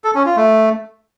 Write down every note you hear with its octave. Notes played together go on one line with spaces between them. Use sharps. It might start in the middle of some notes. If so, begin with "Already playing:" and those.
A4
C#4
F4
A3